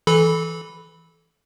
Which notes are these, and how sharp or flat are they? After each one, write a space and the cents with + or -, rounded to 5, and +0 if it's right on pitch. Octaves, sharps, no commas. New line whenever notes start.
E3 +0 A4 -20 B5 +0